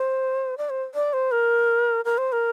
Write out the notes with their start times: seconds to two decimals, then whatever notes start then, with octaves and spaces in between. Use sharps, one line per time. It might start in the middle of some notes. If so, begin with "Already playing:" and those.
Already playing: C5
0.58 D5
0.70 C5
0.95 D5
1.13 C5
1.32 A#4
2.05 A#4
2.18 C5
2.32 A#4